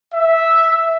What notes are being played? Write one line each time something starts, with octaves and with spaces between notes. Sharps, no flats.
E5